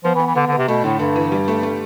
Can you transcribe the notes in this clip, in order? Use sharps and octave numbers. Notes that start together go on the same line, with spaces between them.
F3 B3
E3
B3
E3
D3 B3
D3
B3
C3
B2 A3
A2 D3
G2 D3
E3
G3
A3
A3